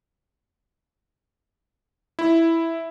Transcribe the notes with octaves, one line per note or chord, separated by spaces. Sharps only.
E4